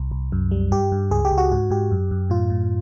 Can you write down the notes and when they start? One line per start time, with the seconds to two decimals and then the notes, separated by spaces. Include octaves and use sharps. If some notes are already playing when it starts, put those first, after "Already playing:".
Already playing: C2
0.11 C2
0.32 F#2
0.51 G3
0.71 G2 G4
0.92 G2
1.11 C#2 G#4
1.25 G4
1.31 C#2
1.38 F#4
1.52 G#2 F#4
1.70 G#2 G4
1.91 F#2
2.11 F#2
2.30 A2 F4
2.50 A2